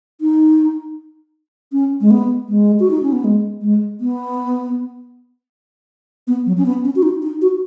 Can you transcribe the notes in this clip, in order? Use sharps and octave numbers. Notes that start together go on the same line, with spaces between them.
D#4
C#4
G#3
B3
G#3
F#4
D#4
C#4
B3
G#3
G#3
B3
B3
F#3
C#4
B3
C#4
F#4
D#4
D#4
F#4